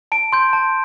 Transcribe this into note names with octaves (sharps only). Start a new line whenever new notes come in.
A5 D7
C6 G6
A5